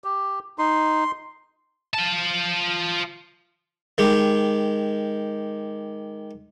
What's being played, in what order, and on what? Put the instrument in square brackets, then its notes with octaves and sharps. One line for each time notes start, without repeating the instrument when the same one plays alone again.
[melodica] G4
[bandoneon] D#4 [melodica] C6
[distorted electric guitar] F4 A5
[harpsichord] D#3 G#3 G4